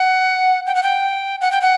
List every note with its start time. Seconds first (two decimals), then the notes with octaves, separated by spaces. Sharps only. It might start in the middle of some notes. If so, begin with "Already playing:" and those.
Already playing: F#5
0.67 G5
0.75 F#5
0.83 G5
1.41 F#5
1.52 G5
1.61 F#5